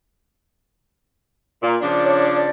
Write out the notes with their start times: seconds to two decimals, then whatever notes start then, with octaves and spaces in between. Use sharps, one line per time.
1.63 A#2
1.82 C#3 F3 D4
2.05 C#5
2.36 D5